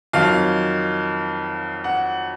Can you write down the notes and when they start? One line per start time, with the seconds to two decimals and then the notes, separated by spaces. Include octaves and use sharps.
0.13 F2 D#3 F#3 F5
1.84 F#5